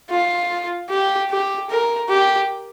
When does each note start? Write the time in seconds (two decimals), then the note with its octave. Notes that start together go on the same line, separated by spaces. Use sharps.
0.10 F4
0.90 G4
1.30 G4
1.70 A#4
2.09 G4